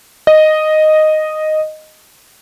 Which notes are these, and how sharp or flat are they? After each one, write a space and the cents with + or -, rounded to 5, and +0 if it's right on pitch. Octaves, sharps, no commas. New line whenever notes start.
D#5 -5